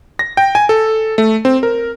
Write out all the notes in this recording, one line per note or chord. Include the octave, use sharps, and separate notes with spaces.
A#6
G5
G#5
A4
A3
C4
A#4